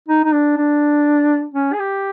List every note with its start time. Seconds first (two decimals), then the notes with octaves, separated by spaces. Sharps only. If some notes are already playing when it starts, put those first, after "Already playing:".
0.08 D#4
0.24 D#4
0.33 D4
0.57 D4
1.54 C#4
1.73 G#4
1.79 G4